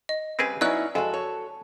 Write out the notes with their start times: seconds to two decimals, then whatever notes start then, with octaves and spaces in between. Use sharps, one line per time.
0.09 D#5
0.39 C#3 G3 C4 G4 G#4 B4
0.61 F#3 B3 C#4 D#4 E4 D5 F#6
0.95 F2 G#3 F#4 A4
1.14 C#5